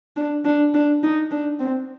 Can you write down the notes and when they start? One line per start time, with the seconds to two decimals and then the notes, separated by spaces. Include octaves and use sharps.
0.17 D4
0.45 D4
0.74 D4
1.03 D#4
1.31 D4
1.60 C4